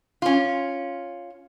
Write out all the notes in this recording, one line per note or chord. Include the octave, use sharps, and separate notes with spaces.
C#4 F4